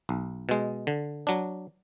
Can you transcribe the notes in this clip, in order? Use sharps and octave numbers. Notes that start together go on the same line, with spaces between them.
B1
B2 G#3
D3
F#3 D4